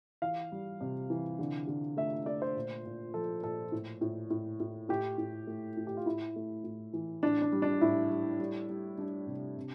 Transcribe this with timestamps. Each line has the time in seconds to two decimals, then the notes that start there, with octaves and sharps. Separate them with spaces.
0.22 E3 F5
0.52 G3
0.81 C3
1.10 E3
1.39 D3
1.68 D3
1.97 A3 E5
2.26 A3 D5
2.42 C5
2.56 A#2
2.85 A#2
3.14 F3 A4
3.43 A#2 A4
3.72 A2
4.01 A2
4.30 A2
4.60 A2
4.89 A2 G4
5.18 A2
5.47 A3
5.77 A2
5.87 G4
5.97 F4
6.06 A2 E4
6.36 A3
6.64 A2
6.93 E3
7.23 A2 D4
7.42 D4
7.52 G3
7.62 D4
7.81 A2 E4
8.10 G3
8.39 G3
8.69 G3
8.98 G3 D4
9.27 C3
9.57 C3